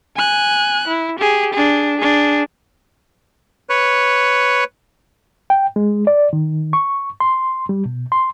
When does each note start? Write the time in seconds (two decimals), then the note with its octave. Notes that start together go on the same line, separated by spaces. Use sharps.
0.17 G#5 F#6
0.88 E4
1.19 G4 G#4
1.53 D4 G#4
1.97 D4 G#4
3.69 B4 C#5
5.50 G5
5.76 G#3
6.07 D5
6.33 D#3
6.73 C#6
7.20 C6
7.69 G3
7.85 B2
8.12 C6